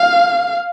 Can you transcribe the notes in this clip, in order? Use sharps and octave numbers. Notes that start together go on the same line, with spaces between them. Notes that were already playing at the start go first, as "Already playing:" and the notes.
Already playing: F5